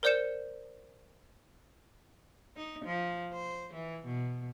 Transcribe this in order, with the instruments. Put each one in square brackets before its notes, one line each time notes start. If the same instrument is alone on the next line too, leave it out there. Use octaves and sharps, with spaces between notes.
[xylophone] A#4 C5 D5 G6 C#7 E7
[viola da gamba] D#4
F3
C5
E3
B2